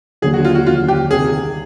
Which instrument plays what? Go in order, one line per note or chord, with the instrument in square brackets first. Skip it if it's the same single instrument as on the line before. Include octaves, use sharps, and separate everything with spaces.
[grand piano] D#2 D3 F#3 [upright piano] G#4
[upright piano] F#4
F4
F#4
[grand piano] D#2 D3 F#3 [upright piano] F4
[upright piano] G4
[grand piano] C2 C3 D#3 [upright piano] G#4